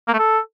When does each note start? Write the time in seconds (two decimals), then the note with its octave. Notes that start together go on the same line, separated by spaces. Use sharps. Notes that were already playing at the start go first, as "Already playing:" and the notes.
0.08 A#3
0.13 A3
0.19 A4